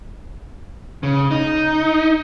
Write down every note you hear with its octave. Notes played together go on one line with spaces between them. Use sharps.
C#3
D#4